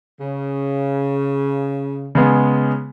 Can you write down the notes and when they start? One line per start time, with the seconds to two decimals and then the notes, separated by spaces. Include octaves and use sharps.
0.20 C#3
2.15 C#3 G#3 B3